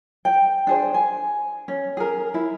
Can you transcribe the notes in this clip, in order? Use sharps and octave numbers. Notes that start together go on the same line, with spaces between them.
G5
D4 G#4 C5
G#5
C#4
G#4 A#4
E4